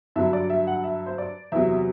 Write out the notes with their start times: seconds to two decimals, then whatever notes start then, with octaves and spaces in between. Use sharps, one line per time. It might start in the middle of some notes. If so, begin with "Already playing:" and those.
0.16 G2 D3 F#3 E5
0.33 D5
0.50 E5
0.67 F#5
0.84 E5
1.06 C5
1.18 D5
1.52 E2 C3 F#3 E5